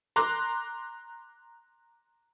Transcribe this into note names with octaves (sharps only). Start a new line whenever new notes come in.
A#5 C6 D6 F#6